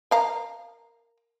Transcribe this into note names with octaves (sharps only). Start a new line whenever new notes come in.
A#4 F5 A#5